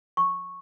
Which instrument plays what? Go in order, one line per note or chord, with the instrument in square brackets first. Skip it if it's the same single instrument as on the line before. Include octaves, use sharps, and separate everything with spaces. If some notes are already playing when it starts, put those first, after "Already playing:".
[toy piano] C#6